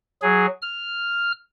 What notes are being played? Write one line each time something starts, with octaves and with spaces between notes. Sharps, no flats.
F#3 G#4
F6